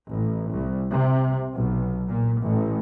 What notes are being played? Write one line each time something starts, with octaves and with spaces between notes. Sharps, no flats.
A1
C2
C3
B1
A#2
A1